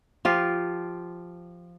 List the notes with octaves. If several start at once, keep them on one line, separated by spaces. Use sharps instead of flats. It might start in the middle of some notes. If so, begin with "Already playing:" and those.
F3 F4 G4